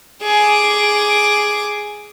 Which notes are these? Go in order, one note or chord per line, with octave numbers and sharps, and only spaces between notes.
G#4 D6